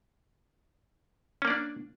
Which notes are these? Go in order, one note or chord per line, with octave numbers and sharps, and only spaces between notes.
A#3 C#4 D4 D5